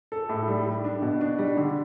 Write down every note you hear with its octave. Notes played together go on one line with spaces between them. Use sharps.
A4
A2
G3
G3
D4
B2
D4
G3
D3